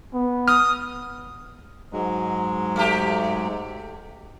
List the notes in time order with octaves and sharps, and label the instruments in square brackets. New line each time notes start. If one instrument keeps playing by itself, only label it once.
[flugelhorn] B3
[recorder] D#6 [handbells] F6
[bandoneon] G#2 F#3 G#3
[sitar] A3 G4